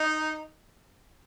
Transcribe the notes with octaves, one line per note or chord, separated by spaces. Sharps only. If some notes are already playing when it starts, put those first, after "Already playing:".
Already playing: D#4